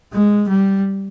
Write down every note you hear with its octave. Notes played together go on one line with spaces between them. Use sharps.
G#3
G3